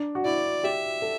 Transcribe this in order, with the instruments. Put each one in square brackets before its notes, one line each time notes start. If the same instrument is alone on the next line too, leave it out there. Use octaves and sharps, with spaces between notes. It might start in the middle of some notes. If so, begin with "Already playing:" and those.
Already playing: [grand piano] D4
F#4
[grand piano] E4 [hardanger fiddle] D5
[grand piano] G4 [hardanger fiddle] E5
[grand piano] A4